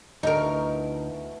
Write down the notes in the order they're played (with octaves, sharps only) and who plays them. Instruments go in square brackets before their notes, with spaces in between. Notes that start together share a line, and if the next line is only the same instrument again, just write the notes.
[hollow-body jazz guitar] D2 [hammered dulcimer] B2 E3 A3 [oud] D#4 A#4